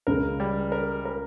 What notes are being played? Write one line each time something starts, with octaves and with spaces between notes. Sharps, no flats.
C#2 C#3 A#4
G3
A#4
A#4